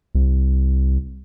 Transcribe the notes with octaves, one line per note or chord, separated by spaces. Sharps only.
C2